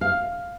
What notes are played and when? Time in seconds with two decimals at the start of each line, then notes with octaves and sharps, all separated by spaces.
0.01 F5